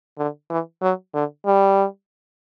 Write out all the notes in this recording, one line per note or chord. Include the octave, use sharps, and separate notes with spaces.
D3
E3
F#3
D3
G3